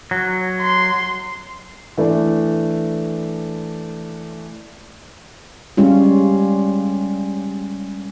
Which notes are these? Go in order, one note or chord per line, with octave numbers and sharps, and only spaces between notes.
F#3
C6
E3 A3 D4
G3 G#3 C#4 F4